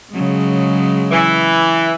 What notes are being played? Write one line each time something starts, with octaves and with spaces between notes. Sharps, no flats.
C#3 F#3 G#3
E3